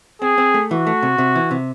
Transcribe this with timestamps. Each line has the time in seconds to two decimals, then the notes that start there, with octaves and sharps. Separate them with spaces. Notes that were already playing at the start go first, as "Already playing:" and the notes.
0.22 C4 G#4
0.38 C4
0.54 A3
0.71 E3 F#4
0.87 A3
1.03 C3
1.18 C3
1.36 E3
1.51 C3